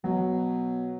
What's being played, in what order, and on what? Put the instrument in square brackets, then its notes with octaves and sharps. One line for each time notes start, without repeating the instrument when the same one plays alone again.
[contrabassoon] B2 [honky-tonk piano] F#3